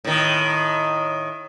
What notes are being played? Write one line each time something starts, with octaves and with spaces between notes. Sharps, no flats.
A2 D#3